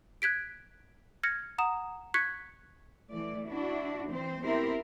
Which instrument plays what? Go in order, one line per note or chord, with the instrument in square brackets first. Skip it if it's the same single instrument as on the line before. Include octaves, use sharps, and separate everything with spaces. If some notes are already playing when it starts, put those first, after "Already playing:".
[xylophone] F#6 G#6 B6 D7
F6 G#6 A#6 C#7
F#5 A#5 D#6 E7
C#6 F#6 G#6 B6 C#7
[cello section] E3 A3 D5
D4 E4 F#4
E3 C4 C5
B3 C4 E4 G4 A#4 C5